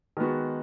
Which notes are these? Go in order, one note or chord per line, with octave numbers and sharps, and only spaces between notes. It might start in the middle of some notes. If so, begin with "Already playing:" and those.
D#3 G#3 B3 F#4